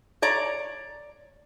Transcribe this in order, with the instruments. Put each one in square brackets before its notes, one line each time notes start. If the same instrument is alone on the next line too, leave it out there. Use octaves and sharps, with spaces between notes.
[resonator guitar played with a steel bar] C#5 D5 A#5